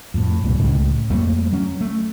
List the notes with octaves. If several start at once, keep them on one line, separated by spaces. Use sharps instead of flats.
F2 A2
C2 F#2 B2
C#2 A2 C#3 G#3
F2 G3 A3 A#3
F#3 C#4
A3